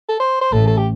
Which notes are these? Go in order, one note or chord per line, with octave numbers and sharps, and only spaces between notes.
A4
C5
C5
A1 A2 A4
A4
G4